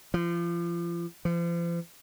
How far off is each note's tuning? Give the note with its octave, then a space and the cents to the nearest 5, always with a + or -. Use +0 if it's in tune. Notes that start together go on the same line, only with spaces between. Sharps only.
F3 -35
F3 -40